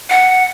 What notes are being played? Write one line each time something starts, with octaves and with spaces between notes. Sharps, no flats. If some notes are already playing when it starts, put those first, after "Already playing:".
F#5